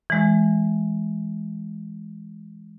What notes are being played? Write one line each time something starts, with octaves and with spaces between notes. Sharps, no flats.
E3 G#3